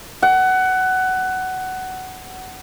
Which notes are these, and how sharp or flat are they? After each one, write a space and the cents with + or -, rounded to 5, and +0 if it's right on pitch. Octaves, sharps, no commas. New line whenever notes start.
F#5 +15